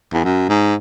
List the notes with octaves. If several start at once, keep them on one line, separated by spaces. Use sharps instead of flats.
E2
F#2
G#2